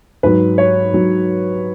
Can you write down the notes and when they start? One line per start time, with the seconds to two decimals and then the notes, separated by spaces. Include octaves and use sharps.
0.23 G#2 F#3 B4
0.58 C#5
0.93 G#2 F#3